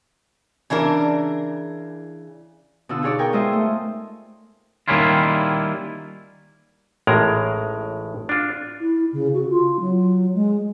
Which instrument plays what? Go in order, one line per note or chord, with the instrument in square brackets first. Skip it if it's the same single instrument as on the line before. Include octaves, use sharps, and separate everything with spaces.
[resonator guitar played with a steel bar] C#3 E3 D4 A#4
[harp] B2 D3 F4 E6
D#4 G#4 C#5 D5
A#4 G5 G#5 C#6
G#3 F4 C5 D#5 E5
A3
[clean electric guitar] D#3 G3 A#3 C#4 E4 F4
[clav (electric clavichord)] A1 A2 G#3 D#4 A#4 A#5
D4 F4
[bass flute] E4
C#3
F#4
F4
F#3
G#3